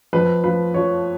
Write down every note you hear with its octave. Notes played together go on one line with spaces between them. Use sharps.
F2 B4
F3 B4
F3 C#5